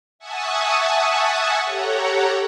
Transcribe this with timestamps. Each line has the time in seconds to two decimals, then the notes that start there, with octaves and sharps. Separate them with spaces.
0.19 E5 F#5 G#5 A5 C#6 D#6
1.64 G4 A4 C#5 F#5 A#5